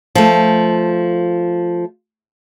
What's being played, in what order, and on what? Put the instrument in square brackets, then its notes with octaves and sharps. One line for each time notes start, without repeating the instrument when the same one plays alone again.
[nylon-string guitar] F3 A3